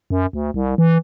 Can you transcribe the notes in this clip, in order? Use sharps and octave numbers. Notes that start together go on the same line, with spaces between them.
F#2
D2
C2
E3